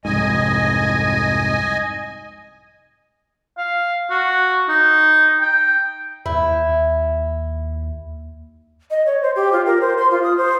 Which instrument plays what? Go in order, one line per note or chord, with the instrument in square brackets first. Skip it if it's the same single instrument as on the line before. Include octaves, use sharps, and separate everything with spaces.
[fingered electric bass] C2 F2 G#2 [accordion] D#5 G#5
[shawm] F5
F#4
D#4
G5
[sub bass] D#2 [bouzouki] E4
[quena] D#5
C#5
C5
G4
F4
A#4
C5
C6
F4
D#6
C5